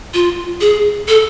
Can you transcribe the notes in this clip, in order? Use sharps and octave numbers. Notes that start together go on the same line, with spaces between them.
F4
G#4
A4